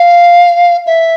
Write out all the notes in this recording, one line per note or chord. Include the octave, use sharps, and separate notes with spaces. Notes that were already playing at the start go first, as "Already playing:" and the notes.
Already playing: F5
E5